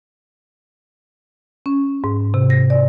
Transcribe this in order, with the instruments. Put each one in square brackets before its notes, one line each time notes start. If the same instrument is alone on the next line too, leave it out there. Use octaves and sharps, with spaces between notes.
[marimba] C#4
G#2
C3
A#6
D5